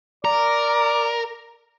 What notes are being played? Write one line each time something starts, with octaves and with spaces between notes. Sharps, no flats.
A#4 D5